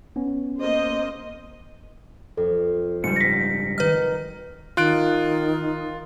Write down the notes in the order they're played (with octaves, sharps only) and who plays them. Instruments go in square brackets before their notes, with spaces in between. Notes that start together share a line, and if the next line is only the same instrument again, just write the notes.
[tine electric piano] B3 C#4
[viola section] A#3 C5 D#5
[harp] F2 [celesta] A4
[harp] F#1 [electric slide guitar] G#2 G3 [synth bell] C#7
[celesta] A#6 B6
[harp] D#3 D#4 [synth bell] B4 F6
[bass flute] D#3 [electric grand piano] F4 F#6 D7